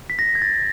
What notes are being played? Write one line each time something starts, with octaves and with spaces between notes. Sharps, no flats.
B6
A#6
G#6
A6